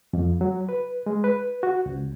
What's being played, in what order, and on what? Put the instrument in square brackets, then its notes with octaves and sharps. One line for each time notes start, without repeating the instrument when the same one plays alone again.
[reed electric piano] F2
F#3
B4
G#3
B4
F#4
C#2